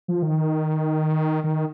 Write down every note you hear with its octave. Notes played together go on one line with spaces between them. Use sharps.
F3
D#3
D#3